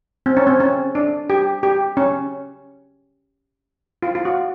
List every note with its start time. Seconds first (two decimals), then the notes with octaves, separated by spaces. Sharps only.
0.26 C4
0.37 C#4
0.47 C4
0.60 C#4
0.95 D4
1.30 G4
1.63 G4
1.97 C#4
4.02 F4
4.15 F4
4.25 F#4